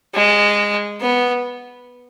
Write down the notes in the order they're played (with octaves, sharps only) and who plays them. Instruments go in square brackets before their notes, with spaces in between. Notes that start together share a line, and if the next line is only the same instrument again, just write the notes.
[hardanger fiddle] G#3
B3